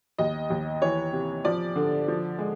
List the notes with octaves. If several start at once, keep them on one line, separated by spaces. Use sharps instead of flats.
D#2 D#5
D#2
E3 C#5
C3
F3 D5
D3
F3
G#3